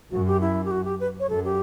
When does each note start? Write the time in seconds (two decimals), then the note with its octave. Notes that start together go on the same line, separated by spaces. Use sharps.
0.11 F#2 F#4
0.27 G4
0.41 E4
0.65 G4
0.71 F#4
0.85 G4
1.00 B4
1.20 C#5
1.29 F#2 A4
1.45 G4